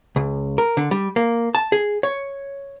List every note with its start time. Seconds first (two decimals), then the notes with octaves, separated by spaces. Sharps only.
0.16 C#2
0.58 A#4
0.77 D3
0.91 G3
1.16 A#3
1.55 A5
1.72 G#4
2.03 C#5